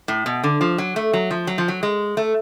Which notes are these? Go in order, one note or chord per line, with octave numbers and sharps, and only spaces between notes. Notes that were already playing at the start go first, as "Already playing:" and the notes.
A2
B2
D3
F3
F#3
A3
F#3
F3
F#3
F3
F#3
G#3
A3